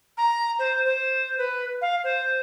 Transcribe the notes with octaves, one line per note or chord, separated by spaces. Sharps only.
A#5
C5
C5
B4
F5
C5